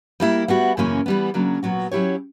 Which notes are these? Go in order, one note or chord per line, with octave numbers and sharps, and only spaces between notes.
G3 A#3 E4
G3 B3 F#4
F#2 C#3 E3 A#3 C#4
E3 G3 B3
C#3 F#3 A#3 D4
A#2 F#3 B3 F#4
F#3 C#4 E4 G4 C#5